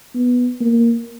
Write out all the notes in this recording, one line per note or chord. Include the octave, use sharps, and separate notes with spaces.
B3
A#3